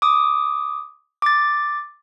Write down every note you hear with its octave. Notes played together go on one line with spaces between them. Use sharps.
D6 D#6
D6 A6